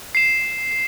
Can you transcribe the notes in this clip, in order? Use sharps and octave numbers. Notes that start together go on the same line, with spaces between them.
C7 E7